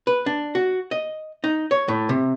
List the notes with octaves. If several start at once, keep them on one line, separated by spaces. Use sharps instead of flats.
B4
D4
F#4
D#5
D#4
C#5
A2
C3